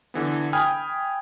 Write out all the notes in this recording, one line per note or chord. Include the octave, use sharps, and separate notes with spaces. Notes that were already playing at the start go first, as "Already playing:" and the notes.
D3 E3 B3
G5 G#5 B5 D#6 F6 G#6